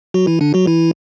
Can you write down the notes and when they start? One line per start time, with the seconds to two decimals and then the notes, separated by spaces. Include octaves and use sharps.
0.14 F#3 F#4
0.27 E3 E4
0.41 D3 D4
0.54 F#3 F#4
0.67 E3 E4